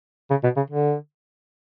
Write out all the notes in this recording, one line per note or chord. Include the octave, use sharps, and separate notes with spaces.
C#3
B2
C#3
D3